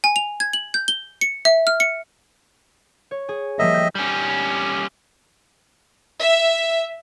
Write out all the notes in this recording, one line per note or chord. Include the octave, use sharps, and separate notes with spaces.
G#5
F7
G#6
F#7
G6
G7
C#7
E5
F6
C#7
C#5
G#4
F3 G3 A#3 D#5 E5
A3 G6
G3 C#4
E5